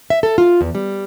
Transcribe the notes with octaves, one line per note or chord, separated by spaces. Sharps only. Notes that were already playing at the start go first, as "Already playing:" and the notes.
E5
A4
F4
E2
G3